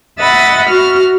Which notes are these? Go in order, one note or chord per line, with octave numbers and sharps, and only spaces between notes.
D#5 E5 F#5 B5 A6
F#4 F6